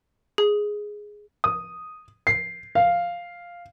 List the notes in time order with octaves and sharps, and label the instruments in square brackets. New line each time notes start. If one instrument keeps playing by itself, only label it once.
[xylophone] G#4
[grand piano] D#6
C7
F5